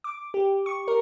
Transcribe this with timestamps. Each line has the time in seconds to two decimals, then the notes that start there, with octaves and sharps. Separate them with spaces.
0.04 D6
0.34 G4
0.66 C#6
0.88 A#4